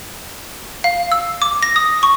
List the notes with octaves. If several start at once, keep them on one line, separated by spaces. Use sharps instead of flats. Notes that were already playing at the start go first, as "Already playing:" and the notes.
F5
E6
D6
A#6
D#6
C#6